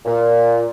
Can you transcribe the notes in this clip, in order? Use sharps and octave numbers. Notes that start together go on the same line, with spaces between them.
A#2